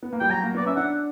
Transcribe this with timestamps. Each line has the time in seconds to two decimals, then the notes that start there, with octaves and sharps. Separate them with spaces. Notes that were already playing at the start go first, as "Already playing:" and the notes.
0.03 B3
0.13 A#3
0.20 G3 G5
0.30 F#3 A#5
0.43 A#3
0.55 B3 D5
0.65 C#4 E5
0.76 D4 F#5